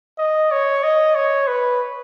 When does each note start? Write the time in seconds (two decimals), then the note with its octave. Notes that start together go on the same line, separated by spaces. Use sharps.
0.18 D#5
0.51 C#5
0.83 D#5
1.15 C#5
1.47 B4